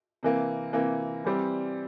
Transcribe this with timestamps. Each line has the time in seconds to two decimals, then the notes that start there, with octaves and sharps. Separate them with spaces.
0.23 C3 E3 A#3
0.73 C3 E3 A#3
1.25 E3 G3 C4 G4